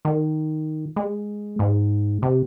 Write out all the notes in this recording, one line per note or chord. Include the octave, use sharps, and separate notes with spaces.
D#3
G#3
G#2
C3